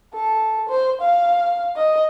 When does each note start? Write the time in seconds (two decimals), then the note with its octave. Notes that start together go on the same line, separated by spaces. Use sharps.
0.15 A4
0.69 C5
1.01 F5
1.76 D#5